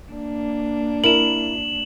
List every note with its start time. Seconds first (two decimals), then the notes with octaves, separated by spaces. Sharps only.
0.12 A#3 D4
1.04 E4 A#4 E7 F#7